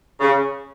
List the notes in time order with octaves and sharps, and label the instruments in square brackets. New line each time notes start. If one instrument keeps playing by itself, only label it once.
[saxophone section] C#3